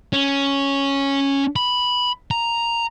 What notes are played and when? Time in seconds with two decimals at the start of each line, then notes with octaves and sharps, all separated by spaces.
0.13 C#4
1.56 B5
2.31 A#5